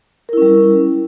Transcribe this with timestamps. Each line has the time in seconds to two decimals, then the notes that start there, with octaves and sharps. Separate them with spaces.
0.29 A#4
0.33 E4
0.37 C#4
0.42 G3